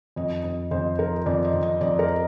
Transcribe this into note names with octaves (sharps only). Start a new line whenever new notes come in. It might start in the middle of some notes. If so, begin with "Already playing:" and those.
F2 D#5
F2
F2 C5
F3 A#4
F2 D5
D#5
F2
D#5
F2 D5
A#4